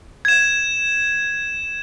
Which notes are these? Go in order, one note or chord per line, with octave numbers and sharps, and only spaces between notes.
G#6 E7